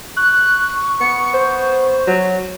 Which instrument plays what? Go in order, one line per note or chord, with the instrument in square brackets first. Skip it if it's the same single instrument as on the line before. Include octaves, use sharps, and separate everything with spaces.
[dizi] C#6 [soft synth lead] F#6
[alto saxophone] B3 [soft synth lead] C#7
[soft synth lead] C5
[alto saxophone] F#3